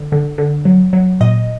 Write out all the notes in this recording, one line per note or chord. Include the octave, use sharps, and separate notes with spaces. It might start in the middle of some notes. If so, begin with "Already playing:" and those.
Already playing: D3
D3
D3
F#3
F#3
A#2 D#5